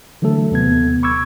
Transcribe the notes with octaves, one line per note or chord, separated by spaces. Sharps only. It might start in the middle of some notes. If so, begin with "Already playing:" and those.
D3 E3 F#3 A3 A4
D#2 C3 B3 G#6
B5 C#6 D6 E6 G#6